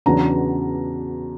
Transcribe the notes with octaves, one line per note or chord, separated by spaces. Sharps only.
E2 C#3 F#3 B3 D4 A#5